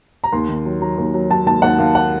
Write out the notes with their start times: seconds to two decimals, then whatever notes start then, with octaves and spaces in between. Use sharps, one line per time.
0.24 A#5
0.33 D#2 C6
0.49 D#3
0.65 F#3
0.81 F#3 A#5
0.98 D#2
1.14 F#3
1.30 F#3 A5
1.46 D#2 A5
1.62 D#2 F#5
1.79 D#2 F5
1.95 F#5